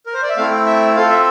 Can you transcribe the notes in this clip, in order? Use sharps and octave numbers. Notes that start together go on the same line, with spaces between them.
A#4
C5
D5
E5
A3 C4 E4 F5
G5
E5
C4 F4 A4 F5
E5